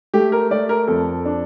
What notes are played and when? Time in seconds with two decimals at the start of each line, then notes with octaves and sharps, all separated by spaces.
0.14 A3 G4
0.32 A#4
0.51 A3 D5
0.69 A#4
0.87 F2 A4
1.25 D4